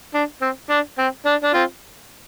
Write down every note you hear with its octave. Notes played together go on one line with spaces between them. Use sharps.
D4
C4
D4
C4
D4
D4
C4 F4